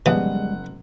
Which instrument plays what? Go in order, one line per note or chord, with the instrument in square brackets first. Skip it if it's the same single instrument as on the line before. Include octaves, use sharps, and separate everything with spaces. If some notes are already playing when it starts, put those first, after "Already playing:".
[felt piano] F#1 F#5 [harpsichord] E3 [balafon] F3 B3 [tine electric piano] G3 G#3